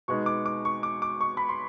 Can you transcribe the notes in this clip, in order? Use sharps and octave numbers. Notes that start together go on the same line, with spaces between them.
B2 G#3 B3 D#4 C#6
D6
D6
C#6
D6
D6
C#6
B5
C6